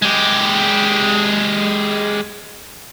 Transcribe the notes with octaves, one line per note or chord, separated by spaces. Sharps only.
G#3 G4